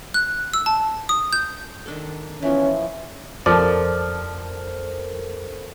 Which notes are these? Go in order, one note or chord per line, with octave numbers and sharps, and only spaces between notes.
F#6
E6
A5
D#6
G6
D#3 D4 A4
E3 F3 B3 C#4
F2 F3 A4 A#4 C5 D5 A5